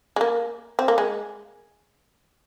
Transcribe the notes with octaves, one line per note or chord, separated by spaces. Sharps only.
G#3
A#3
C4
A#3
G#3